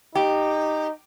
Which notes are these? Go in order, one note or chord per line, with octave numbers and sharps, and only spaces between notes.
D#4 G4